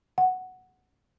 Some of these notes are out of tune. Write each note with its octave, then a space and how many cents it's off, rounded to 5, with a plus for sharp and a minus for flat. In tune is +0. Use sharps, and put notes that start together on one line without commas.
F#5 +0